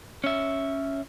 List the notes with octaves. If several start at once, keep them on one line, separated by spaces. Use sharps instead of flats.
C#4 E5